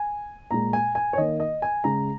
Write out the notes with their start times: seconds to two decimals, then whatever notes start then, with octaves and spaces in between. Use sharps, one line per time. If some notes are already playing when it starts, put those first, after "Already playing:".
Already playing: G#5
0.51 A#2 G#3 A#5
0.73 G#5
0.95 G#5
1.13 C#5
1.18 D#3 A#3 D#5
1.40 D#5
1.62 G#5
1.84 C#3 G#3 A#5